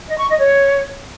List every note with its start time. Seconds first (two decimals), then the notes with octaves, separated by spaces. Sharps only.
0.08 D#5
0.19 C#6
0.29 D#5
0.39 C#5